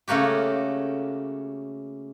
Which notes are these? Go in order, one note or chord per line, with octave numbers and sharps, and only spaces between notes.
C#3 A3 A#3 F#4 G4